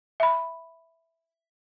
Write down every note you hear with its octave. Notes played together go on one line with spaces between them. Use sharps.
E5 B5